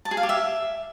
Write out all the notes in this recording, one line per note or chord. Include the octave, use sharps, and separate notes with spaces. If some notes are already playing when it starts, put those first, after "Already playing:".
A5
G#4
F5
G4
E5